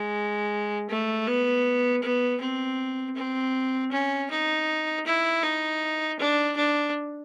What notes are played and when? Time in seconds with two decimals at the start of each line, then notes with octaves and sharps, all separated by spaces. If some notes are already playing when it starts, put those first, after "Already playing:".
Already playing: G#3
0.90 A3
1.27 B3
2.02 B3
2.40 C4
3.16 C4
3.92 C#4
4.30 D#4
5.06 E4
5.43 D#4
6.19 D4
6.57 D4